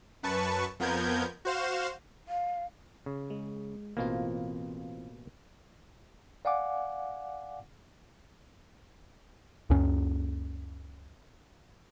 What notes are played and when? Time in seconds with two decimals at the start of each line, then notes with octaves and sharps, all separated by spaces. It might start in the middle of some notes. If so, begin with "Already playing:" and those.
0.23 F#2 B4 A5 C#6
0.80 F2 F3 B3 A#4 G6 G#6
1.45 F#4 C5 F5 E7
2.28 F5
3.06 C#3
3.30 G#3
3.97 A1 B2 E3 A#3 C4 F4
6.45 D5 F5 F#5 G#5 D6
9.70 C#2 F#2 C#4